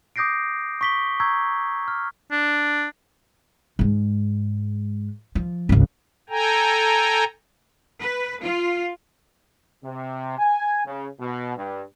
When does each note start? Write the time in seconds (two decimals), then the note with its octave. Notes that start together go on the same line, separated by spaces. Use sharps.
0.16 D6 D#6 G6 A#6 C7 D7
0.81 C#6 B6 G7
1.20 A#5 C#6 E6 G6 G#6
1.88 F6
2.31 D4
3.79 G#2 G#3
5.35 F3
5.69 G#1 C#2
6.30 A4 G5 G#5 A#5
8.01 B4
8.41 F4
9.84 C3
10.38 G#5
10.86 C#3
11.20 B2
11.57 G2